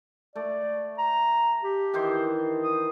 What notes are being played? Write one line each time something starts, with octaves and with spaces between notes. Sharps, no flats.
A3 D5
A#5
G4
D#3 E3 C5
D#6